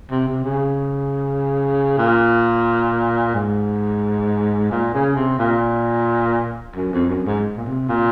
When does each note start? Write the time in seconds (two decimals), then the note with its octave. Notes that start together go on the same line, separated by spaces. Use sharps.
0.11 C3
0.28 C3
0.44 C#3
1.98 A#2
3.35 G#2
4.71 A#2
4.94 C#3
5.16 C3
5.39 A#2
6.76 F#2
6.93 F2
7.09 F#2
7.26 G#2
7.57 A#2
7.66 C3
7.89 A#2